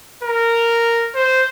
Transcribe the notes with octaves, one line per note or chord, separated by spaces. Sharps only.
A#4
C5